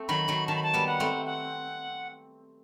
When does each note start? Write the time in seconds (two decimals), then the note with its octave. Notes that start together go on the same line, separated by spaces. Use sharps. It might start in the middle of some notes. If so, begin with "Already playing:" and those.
Already playing: A3 C4
0.08 D#3 F#3 B5
0.28 D#3 F#3
0.48 D#3 A5
0.56 B5
0.63 A5
0.74 G3 B3
0.87 F#5
1.00 A3 C4
1.26 F#5